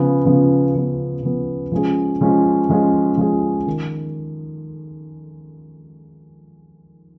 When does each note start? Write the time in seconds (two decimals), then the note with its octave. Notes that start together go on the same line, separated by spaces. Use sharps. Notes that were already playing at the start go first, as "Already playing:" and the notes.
Already playing: C#3 F3 B3
0.25 C#3 F3 B3
0.75 C#3 F3 B3
1.23 C#3 F3 B3
1.72 F3 G#3 C#4 G#4
2.21 F3 G#3 C#4 G#4
2.69 F3 G#3 C#4 G#4
3.17 F3 G#3 C#4 G#4
3.67 D#3